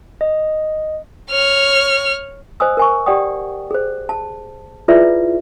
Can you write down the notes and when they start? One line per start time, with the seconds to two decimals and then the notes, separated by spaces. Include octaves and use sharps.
0.21 D#5
1.30 C#5 F6
2.60 C5 D#5 G#5 D#6 E6
2.77 A#4 G#5 C#6
3.06 G4 D5 F#5 G5 D#6
3.71 G#4 C5
4.09 A5
4.88 E4 F4 G#4 B4 D5 E5